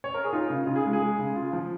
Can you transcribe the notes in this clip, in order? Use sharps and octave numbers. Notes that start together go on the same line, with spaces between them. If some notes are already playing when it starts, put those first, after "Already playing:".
C#5
A#4
G#4
D#4 F4
C#3
C#3 F4
G#4
G#3
G#4
G#3
C#3
F4
F3